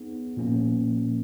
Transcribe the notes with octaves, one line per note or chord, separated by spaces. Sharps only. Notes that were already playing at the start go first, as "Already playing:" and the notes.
Already playing: B3 D#4 G#4
A#2 F3 A#3 C#4